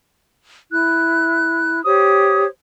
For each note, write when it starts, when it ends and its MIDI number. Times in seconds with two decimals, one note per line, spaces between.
0.71 1.81 64
0.71 1.81 90
1.84 2.45 67
1.84 2.45 72
1.84 2.45 73
1.84 2.45 87